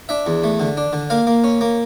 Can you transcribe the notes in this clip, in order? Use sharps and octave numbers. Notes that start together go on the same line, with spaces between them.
D4 E5
E2
A3
D3
D4
D3
A#3 F5
A#3
C#4
A#3